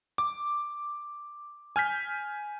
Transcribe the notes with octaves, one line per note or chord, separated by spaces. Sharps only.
D6
G#5 F6 G6 B6